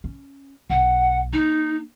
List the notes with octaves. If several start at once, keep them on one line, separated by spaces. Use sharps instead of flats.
C#4
B1 F#5
A#3 D#4